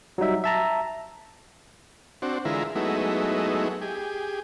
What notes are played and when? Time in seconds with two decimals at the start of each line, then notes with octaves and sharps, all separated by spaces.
0.18 F#3 G3 D#4 E5
0.44 E5 A5 A#5
2.22 C4 D4 F#4
2.45 D3 E3 G#3 E4 F4 A#4
2.75 F#3 G#3 A3 B3 D#4 E4
3.81 G4 G#4